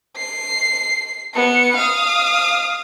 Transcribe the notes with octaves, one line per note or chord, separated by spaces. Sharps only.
C7
B3 C#7
F5 D#6